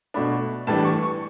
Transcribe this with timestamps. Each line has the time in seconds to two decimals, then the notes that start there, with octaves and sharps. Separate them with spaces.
0.14 B2 A3 D4 B5
0.67 A2 E3 G3 D4 A5
0.85 C#6
1.03 C#6